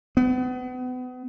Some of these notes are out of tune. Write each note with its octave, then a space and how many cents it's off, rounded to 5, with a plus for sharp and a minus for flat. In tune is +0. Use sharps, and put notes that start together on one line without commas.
B3 +35